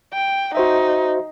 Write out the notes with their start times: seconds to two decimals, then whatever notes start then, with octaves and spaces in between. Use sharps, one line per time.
0.13 G5
0.55 D#4 F#4 C5 E5